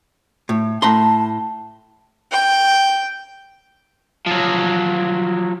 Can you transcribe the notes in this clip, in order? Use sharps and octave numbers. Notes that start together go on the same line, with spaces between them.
A2
A2 A5 A#5 C6
G5
F3 F#3